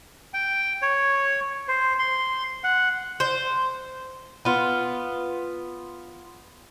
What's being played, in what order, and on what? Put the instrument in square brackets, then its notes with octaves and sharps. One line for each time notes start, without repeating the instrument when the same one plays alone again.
[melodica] G5
C#5
C5
C6
F#5
[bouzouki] C5
B3 F4